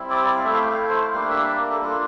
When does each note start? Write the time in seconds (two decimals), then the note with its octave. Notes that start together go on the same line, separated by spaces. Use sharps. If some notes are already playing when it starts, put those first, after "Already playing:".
Already playing: G3 C4 E4
0.10 D5
0.27 D5
0.36 F5
0.44 A3 E5
0.48 E4 F5
0.61 G5
0.70 F5
0.89 C5
1.02 F5
1.13 G3 A#3 D4 F5
1.30 E5
1.46 D5
1.59 A#4
1.70 A4
1.81 A#3 D4 F4 A4